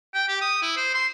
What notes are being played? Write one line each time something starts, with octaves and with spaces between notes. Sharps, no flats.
G5
G4
D#6
E4
C5
C6